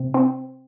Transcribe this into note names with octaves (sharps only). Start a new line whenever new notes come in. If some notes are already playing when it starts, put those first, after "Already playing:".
Already playing: C3
C4